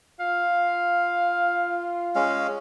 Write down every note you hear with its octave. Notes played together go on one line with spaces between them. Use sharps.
F4 F5
G#3 C#4 F5